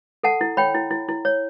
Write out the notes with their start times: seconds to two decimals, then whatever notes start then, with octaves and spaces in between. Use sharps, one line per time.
0.23 A4 F#5 A5
0.41 E4
0.57 C#5 G5 B5
0.74 E4
0.91 E4
1.09 E4
1.25 C#5